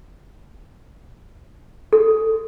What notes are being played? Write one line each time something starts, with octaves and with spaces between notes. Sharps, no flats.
A4